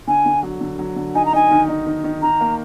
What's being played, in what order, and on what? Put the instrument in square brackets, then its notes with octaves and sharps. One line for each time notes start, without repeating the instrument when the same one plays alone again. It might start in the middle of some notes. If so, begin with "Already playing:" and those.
[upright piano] D3 [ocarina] G#5
[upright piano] D3
F#3
D3
F#3
D3
[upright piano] D#4 [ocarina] G#5
[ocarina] A#5
[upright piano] D#4 [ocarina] G#5
[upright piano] D#3
D#4
D#3
D#3
[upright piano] D#3 [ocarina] A#5
[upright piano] A#3